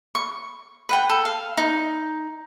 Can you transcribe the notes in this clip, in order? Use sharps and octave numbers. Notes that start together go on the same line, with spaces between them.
C#6
B4 F#5 G5
A4
F5
D#4